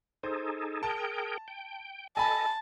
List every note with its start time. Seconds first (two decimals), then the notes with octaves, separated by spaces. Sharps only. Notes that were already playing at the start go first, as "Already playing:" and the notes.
0.23 D#4 G#4 A4 C5
0.83 G#4 A#4 G5 A5
1.48 G5
2.17 A4 D#5 G#5 A5 B5